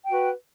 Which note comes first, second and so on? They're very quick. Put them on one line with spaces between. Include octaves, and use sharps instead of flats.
G5 F#4 B4